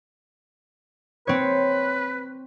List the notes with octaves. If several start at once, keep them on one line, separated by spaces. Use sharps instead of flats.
C4 B4 C#5